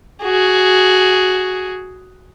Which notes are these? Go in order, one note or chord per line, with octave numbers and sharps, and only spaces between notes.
F#4 G#4